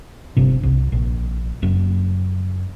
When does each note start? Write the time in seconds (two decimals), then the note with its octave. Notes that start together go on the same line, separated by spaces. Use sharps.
0.37 G1 G2 C3
0.63 C2
0.92 A#1
1.62 F#1 F#2